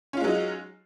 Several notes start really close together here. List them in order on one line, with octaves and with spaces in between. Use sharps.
C#4 F4 G#3 F#3 D#4